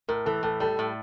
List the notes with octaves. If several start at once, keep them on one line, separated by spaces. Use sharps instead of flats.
A2 A#4
E3 A4
A2 A4
G3 A4
A2